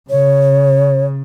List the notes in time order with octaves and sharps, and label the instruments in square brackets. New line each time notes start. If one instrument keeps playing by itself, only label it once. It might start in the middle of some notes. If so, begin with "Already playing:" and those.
[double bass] C#3 [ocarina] C#5